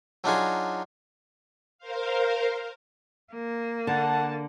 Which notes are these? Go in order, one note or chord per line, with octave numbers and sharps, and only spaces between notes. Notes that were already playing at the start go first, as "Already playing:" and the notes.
F#3 D4 D#4 F4 F#4 G#4
A#4 C5 F5
A#3
D3 F#5 A5